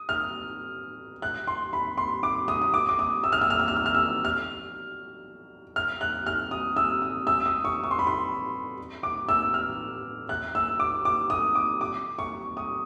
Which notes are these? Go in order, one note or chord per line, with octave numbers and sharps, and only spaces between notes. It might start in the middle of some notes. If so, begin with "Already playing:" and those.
Already playing: D#6
F6
F#6
C6
B5
C6
D6
D#6
D#6
D6
D6
D#6
E6
F6
E6
F6
E6
F6
E6
F6
E6
F6
F6
F#6
F6
D#6
E6
D#6
E6
D#6
C#6
C#6
C6
B5
C6
D6
E6
F6
F#6
E6
D6
D6
D#6
D6
D6
C#6
D#6